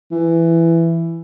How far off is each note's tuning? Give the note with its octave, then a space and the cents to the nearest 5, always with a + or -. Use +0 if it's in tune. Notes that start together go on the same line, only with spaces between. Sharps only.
E3 +10